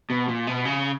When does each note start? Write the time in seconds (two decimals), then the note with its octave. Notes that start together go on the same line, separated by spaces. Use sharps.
0.10 B2
0.28 A#2
0.47 B2
0.65 C#3